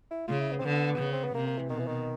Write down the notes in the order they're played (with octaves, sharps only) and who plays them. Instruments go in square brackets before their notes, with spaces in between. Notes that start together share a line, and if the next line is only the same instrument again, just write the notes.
[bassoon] E4
[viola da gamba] C#3 [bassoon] F4
[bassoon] E4
B3
C4
[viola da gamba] D3 [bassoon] B3
[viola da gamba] C#3
[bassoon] C4
B3
[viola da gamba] C3 [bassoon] A#3
[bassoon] A#3
E3
[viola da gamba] B2 [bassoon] D#3
[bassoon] E3
D#3